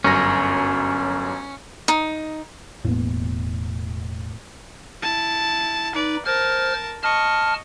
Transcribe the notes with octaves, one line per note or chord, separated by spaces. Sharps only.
G1 F#2 C#4 A#6
D#4
E1 A2 A#3 B3
E4 A5
D#4 B4 D5
A#4 C5 A5 F6
D#5 A5 C#6 F6